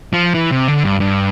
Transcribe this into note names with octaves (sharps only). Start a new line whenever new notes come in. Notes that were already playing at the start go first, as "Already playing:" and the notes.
F3
E3
C3
D3
G2
G2